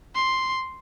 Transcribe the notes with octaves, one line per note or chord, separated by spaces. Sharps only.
C6